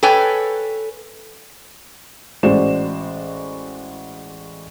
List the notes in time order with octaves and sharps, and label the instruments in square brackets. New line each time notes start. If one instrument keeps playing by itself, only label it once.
[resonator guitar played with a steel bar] A4 B4 C#5 G5 G#5
[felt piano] A1 G#3 F#4 C5 D5 E7